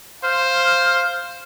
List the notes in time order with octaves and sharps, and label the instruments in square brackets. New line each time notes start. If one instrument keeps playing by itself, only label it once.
[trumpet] C5 [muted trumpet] F5 [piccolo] F6